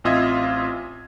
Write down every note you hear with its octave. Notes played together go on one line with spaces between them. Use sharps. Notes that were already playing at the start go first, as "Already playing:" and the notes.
A1 C4 F4 D#5 E5 G#6